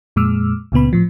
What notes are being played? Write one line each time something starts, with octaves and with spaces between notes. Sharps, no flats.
F2 A#2 G#3 D6 E6 F6
C#2 A#2 C#3 B3 B5
A2 F3